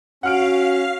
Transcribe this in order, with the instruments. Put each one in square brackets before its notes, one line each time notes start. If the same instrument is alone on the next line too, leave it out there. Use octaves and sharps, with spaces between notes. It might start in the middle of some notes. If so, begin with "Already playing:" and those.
[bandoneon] C#4 [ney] F#4 [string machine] F5 [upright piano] F#5 F6 D7